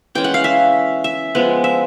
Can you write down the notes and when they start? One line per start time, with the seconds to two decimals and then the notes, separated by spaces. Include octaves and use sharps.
0.15 E3 G#3 C#4 G5
0.24 F#5
0.34 F5
0.44 E5
1.04 E5
1.35 F3 G#3 B3
1.64 E5